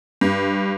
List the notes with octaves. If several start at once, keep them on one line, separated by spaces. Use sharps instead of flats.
G2